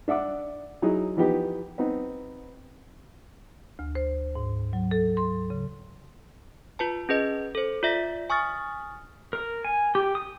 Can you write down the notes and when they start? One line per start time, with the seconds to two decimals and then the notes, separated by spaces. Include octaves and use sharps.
0.08 D4 E5 F#5 D6
0.82 F#3 D#4 E4 G#4
1.16 E3 F3 B3 D#4 G4 B4
1.78 B3 C4 D#4
3.79 D2
3.95 C5
4.35 G#2
4.73 F#3
4.91 A4
5.17 C6
5.50 C#3
6.79 F4 B4 A5
7.09 C#4 G#4 B4 D#5
7.55 A4 C5
7.83 F4 D5 E5 A#6 B6
8.30 G#5 C#6 D#6 F6 A6
9.33 A#4
9.65 G#5
9.95 G4
10.15 D#6